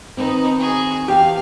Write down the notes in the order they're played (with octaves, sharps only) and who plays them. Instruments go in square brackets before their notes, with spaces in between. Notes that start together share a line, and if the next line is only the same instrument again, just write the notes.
[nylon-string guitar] D#3 C4 [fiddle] B3 D#4
[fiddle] F#4 G#4
[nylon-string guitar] E2 [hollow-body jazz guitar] G4 [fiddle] F5 [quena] G5